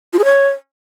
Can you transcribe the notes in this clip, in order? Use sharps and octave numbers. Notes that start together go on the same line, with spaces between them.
F4
G#4
C#5